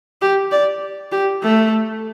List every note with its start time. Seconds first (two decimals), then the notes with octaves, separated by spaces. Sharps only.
0.22 G4
0.52 D5
1.12 G4
1.43 A3